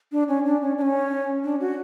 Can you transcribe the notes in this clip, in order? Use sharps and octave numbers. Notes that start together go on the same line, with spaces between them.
D4
C#4
D4
C#4
D4
C#4
D4
F#4